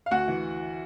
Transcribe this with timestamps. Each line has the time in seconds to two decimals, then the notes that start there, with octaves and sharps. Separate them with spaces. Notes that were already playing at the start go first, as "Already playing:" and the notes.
0.06 F5
0.11 D2 F#4 F#5
0.28 E3